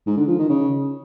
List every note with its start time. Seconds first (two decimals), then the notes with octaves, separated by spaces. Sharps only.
0.07 G#2
0.17 D3
0.28 F3
0.39 D#3
0.49 C#3